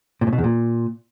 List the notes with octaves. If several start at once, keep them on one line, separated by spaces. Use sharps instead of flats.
A#2
A2
B2
E2
A#2